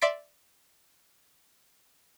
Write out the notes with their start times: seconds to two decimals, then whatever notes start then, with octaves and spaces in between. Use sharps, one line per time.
0.01 D5 E5 C6 A6 B6 D7